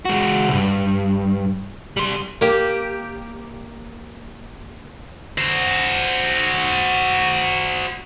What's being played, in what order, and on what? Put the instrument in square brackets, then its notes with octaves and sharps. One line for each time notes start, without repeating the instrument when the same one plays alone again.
[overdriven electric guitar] G#3 F#4
C2 G2
G3 C6
[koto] A#3 G4
[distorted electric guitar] F#4 C5